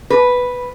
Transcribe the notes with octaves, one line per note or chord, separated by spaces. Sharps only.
B4